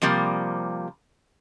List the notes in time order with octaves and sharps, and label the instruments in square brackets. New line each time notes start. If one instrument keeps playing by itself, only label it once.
[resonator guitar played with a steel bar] C3 F3 G3 A#3